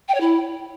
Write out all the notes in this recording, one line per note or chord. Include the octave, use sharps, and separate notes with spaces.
G5
C#5
E4